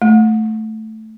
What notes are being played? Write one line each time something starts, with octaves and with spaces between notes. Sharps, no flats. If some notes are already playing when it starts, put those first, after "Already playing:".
A3